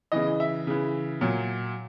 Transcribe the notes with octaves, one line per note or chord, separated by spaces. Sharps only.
C#3 E3 D#5
E5
C#3 E3
A#2 F#3